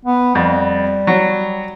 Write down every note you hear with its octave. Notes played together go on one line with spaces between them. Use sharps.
B3
F2 G3
F#3